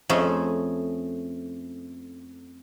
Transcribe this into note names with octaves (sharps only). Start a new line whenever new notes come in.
F2 A3 C#4 G#4